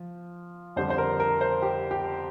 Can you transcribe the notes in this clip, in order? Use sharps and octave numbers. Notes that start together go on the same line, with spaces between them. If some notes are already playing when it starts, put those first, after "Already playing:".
Already playing: F3
F2 D3 G3 C5
C5
A#4
A#4
C5
G4
G4